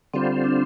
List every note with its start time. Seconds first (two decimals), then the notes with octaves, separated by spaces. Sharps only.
0.14 D3 G3 C4 F4 C5
0.44 D4